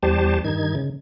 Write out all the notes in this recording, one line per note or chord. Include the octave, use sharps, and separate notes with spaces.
E2 G3 G4 C5 A5
G2 D#3 D#4 G#6
C#3